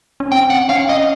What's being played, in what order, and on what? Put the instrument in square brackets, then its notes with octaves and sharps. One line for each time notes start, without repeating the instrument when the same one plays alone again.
[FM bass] C#4
[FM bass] C4 [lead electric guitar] G5
[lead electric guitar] F#5
[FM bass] C#4 [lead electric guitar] F5
[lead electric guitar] D#5